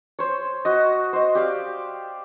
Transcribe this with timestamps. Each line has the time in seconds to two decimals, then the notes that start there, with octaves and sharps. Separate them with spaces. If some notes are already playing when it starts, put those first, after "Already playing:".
0.19 C5 C#5
0.65 F#4 D#5
1.13 C5 D#5
1.35 G4 D5 F5